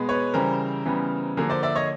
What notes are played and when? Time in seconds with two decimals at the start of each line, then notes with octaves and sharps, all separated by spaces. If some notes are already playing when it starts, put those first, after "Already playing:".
Already playing: B2 G#3 B3
0.09 B4 C#5
0.34 C#3 E3 G3 A#4 C5
0.86 C#3 E3 G3 B3
1.37 D3 F3 A#3 G#4 A#4
1.50 C5 D5
1.63 D5 E5
1.76 C#5 D#5